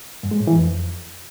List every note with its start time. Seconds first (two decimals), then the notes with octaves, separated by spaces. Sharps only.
0.23 G2
0.31 G#3
0.39 A2
0.47 E3
0.55 F2